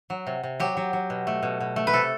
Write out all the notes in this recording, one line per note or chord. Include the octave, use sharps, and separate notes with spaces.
F#3
C3
C3
F#3 G4
F#3
F#3
B2
A3
B2
B2
A3
B4
C3 A4